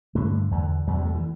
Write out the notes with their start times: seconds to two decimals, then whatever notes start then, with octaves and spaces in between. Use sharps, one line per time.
0.15 G2 D3 A3
0.51 E2 D3
0.87 E2 C3 G3
0.96 F#3
1.05 A3
1.14 E3